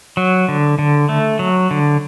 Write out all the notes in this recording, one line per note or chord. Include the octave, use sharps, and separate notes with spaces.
F#3
D3
D3
A3
F#3
D3